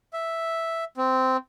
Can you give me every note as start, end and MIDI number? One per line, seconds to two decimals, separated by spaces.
0.13 0.84 76
0.97 1.37 60